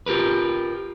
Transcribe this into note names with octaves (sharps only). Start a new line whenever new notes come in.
F4 G4 A#4 B4